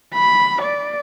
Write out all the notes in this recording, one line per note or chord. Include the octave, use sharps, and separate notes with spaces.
B5
D5